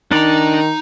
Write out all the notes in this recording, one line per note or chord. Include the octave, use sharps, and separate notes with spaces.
D#3 D4 D#4 D5 A#5